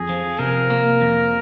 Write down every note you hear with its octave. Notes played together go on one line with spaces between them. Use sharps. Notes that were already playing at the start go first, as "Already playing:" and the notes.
Already playing: F2 G#4
F3
C3 A#4
A#3
F2